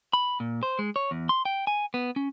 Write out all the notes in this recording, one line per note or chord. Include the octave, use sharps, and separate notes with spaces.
B5
A#2
C5
G#3
C#5
E2
C6
G5
G#5
B3
C#4